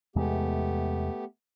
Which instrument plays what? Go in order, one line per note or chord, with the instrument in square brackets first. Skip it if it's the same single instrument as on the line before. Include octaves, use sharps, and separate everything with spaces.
[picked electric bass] E2 C3 G#3 [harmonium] A3 B3 G4